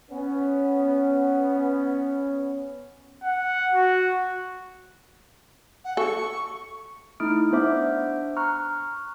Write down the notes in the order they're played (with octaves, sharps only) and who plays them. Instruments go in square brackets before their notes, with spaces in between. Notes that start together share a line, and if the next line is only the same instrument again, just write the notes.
[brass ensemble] B3 C#4
[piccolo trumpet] F#5
F#4
[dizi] F#5
[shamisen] A4 [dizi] C#6
[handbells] A3 D#4 E4 D#6 F6 D7
B3 D4 C5 E5 D6
A#5 C#6 F6 F#6